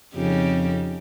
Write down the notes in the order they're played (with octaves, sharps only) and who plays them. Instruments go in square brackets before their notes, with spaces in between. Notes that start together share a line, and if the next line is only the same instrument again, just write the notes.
[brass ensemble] F2 [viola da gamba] C#3 D#4 G4